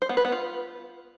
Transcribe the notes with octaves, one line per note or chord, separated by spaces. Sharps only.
C5
B3
B4
B3
F4